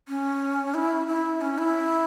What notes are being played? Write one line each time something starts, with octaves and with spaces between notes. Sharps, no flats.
C#4
E4
E4
C#4
E4